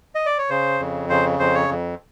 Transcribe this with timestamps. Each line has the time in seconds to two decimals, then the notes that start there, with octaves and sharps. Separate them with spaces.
0.15 D#5
0.26 D5
0.38 C#5
0.50 C#3 C5
0.80 F2
1.09 C#3 C5
1.39 F2 C5
1.54 C#5
1.69 F2